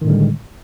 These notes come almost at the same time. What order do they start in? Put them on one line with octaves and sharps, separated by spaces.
D#3 A2 D3 G3 G#3